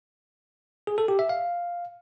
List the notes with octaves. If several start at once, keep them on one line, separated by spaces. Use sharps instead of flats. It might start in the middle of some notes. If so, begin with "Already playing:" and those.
G#4
A4
G4
E5
F5